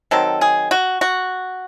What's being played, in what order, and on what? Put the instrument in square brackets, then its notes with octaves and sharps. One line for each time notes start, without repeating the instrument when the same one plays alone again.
[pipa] D#3 F#3 C4 A4
G#4
F#4
F#4